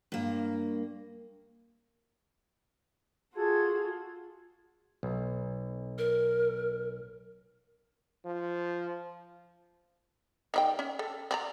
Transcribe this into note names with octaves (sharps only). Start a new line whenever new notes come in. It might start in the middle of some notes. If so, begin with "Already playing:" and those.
G2 A#3
F4 F#4 G#4 A4 G#6
B1
A#4
F3
D#3 D#4 G5
C#4
A4
C4 D5 A#5